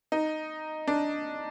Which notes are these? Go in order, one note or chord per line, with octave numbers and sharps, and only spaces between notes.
D#4
D4